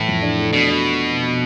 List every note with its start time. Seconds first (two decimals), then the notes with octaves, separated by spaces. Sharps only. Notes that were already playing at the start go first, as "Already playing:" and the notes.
Already playing: A2 E3
0.08 F2
0.22 D4
0.38 A3
0.52 B2 D4
0.67 D4